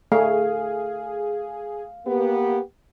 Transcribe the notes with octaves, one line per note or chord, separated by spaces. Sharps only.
A3 G#4 F5
A#3 B3 G4